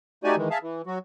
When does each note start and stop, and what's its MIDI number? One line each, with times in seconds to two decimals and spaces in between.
0.24 0.36 57
0.24 0.36 63
0.24 0.36 66
0.24 0.36 67
0.24 0.36 74
0.24 0.36 80
0.37 0.48 51
0.37 0.48 52
0.37 0.48 56
0.51 0.58 68
0.51 0.58 76
0.51 0.58 77
0.51 0.58 81
0.62 0.82 52
0.86 0.98 54
0.86 0.98 66